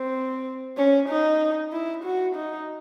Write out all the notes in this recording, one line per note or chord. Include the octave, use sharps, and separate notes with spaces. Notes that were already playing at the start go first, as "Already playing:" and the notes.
Already playing: C4
C#4
D#4
E4
F#4
D#4